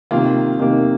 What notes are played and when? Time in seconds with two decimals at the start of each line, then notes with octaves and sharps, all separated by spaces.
0.11 C3 D#3 A#3 F4
0.59 C3 D#3 A#3 D#4